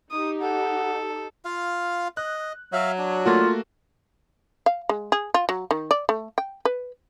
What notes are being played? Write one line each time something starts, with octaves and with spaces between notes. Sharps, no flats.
D#4 G4 D#6
A4 F#5
F4 F5
D#5 F#6
F#3 E5 F5
D4
A3 A#3 F4 F#4
F5
G#3
G#4
F4
F#3
D#3
D5
A3
G5
B4